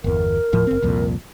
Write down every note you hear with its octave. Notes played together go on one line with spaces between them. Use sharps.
G1 E2 A#4
D#1 A2 F3
F#1 C4
C2 F2 A#2